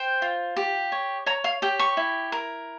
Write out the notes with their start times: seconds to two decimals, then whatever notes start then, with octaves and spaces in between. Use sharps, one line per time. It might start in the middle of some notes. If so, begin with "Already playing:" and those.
Already playing: C5 G5
0.22 F4
0.56 G4
0.92 C#5
1.26 C#5 A#5
1.44 F5
1.62 G4 G5
1.79 C#6
1.97 E4
2.32 A#4